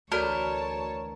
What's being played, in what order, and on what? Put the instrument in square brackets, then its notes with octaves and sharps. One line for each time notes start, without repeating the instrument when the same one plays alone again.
[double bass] D2 E3 [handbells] F#4 A4 D5 [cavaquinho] A#4 [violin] C#5 A5